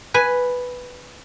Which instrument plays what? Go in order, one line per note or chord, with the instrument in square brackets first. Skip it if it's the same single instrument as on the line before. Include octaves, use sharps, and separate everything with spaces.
[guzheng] B4 G#5